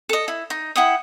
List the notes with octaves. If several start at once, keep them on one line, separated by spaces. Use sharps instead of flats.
A4 D#5
E4
D#4
E4 F#5 G5 D#6